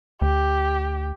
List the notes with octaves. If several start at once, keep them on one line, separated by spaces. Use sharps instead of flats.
D2 G4